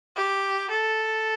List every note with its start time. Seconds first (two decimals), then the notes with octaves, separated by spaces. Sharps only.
0.16 G4
0.70 A4